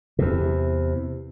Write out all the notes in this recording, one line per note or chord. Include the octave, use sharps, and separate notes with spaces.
E2 C3